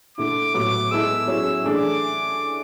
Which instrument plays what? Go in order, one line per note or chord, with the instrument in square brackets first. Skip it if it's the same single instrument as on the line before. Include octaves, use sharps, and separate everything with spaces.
[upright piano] D3 A3 E4 [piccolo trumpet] D6
[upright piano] A2 F#3 B3 [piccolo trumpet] D6
[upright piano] G#3 B3 E4 A4 [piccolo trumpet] E6
[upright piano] F#3 C#4 E4 G#4
[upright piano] E3 A3 D4 G#4 [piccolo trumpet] D6